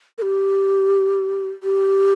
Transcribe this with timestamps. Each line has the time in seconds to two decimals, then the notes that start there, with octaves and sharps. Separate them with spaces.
0.18 A#4
0.22 G4
1.63 G4